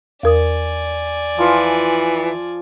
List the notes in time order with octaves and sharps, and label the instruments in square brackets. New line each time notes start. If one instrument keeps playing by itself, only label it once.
[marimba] E2 A#4 D#6 [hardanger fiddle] D5 G#5
[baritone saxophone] E3 [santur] F3 F4